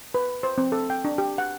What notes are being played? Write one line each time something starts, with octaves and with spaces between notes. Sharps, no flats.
B4
C5
C4
A4
G5
D4
G4
F#5